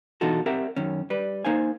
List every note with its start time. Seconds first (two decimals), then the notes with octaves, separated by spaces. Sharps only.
0.21 B2 E3 D#4 F4 F#4 A4
0.46 C4 G4 A#4 E5 F#5
0.76 F#2 D#3 C#4
1.10 G3 B4
1.45 A#3 D#4 C5 F5 G#5